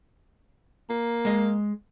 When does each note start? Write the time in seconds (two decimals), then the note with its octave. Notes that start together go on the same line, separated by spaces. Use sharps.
0.90 A#3
1.25 G#3 D#5